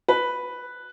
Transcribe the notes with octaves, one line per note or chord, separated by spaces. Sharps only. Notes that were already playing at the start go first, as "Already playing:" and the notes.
B4